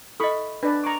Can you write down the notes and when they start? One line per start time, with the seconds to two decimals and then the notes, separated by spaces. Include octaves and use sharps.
0.20 E4 A4 D#5 B5 C#6
0.63 D4 B4 D5 A5
0.84 A#5 C#6 D6